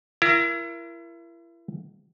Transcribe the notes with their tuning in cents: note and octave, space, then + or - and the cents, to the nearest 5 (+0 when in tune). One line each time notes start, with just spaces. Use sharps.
E4 +35 A#4 +15